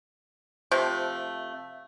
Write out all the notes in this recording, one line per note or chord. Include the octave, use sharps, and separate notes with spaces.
C3 F3 A3